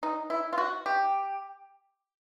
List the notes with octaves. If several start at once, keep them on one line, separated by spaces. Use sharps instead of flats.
D#4
E4
F4
F#4
G4